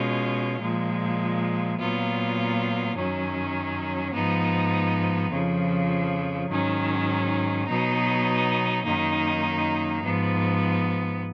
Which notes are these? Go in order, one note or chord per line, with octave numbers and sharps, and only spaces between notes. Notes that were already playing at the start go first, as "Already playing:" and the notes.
Already playing: B2 G#3 C#4 F4
A#2 F3 G#3
A#2 F#3 B3 F4
F#2 D#3 F#3 C#4
G#2 F3 B3 D#4
F2 C#3 F3
G#2 D#3 F#3 C#4
B2 F#3 B3 D#4
F#2 D#3 A#3 D#4
G#2 F3 B3